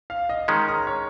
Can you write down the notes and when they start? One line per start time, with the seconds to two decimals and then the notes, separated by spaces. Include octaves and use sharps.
0.10 F5
0.29 D#5
0.48 D#3 G#3 C#4
0.68 A#5
0.87 C#5